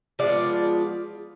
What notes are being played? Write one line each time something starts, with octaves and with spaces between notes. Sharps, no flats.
F3 G#3 B3 F4 D5